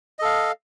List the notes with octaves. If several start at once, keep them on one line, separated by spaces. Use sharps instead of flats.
A4 D#5 F5